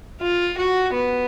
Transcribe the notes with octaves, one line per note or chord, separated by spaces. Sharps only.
F4
F#4
B3